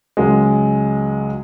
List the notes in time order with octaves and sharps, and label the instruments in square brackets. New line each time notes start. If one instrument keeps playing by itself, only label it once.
[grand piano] C#2 F#3 G#3